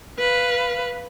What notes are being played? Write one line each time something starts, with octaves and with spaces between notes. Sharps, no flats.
B4 F5